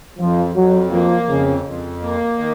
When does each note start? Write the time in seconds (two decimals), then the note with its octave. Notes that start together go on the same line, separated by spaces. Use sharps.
0.19 F2 F3
0.55 F2 F#3
0.92 F3 A#3
1.29 F2 C#3
1.65 F2
2.02 A#3
2.38 D#3